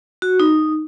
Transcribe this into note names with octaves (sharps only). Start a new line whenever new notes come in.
F#4
D#4